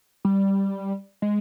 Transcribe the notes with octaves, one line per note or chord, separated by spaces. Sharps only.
G3
G#3